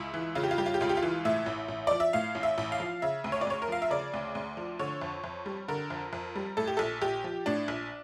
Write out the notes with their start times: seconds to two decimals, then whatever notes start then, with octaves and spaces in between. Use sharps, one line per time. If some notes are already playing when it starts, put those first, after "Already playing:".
Already playing: C#2 E4
0.14 E3
0.35 C#3 F4
0.43 G4
0.51 F4
0.58 G3 G4
0.66 F4
0.74 G4
0.81 C#2 F4
0.89 G4
0.97 F4
1.03 E3
1.25 A2 E5
1.46 A1
1.68 A1
1.87 F3 D5
2.00 E5
2.13 A2 F5
2.35 A1
2.43 E5
2.58 A1
2.72 F5
2.80 F3
3.02 C#3 E5
3.24 D2
3.32 C#5
3.41 D5
3.47 D2 C#5
3.62 A#4
3.68 F3 F5
3.82 E5
3.90 C#3 D5
4.14 D2
4.35 D2
4.57 F3
4.79 D3 C#5
5.02 F2
5.24 F2
5.46 G3
5.68 D3 A#4
5.90 F2
6.13 F2
6.36 G3
6.57 A2 A4
6.67 G4
6.77 A#1 A4
7.02 A#1 G4
7.24 F3
7.46 A2 D4
7.68 A#1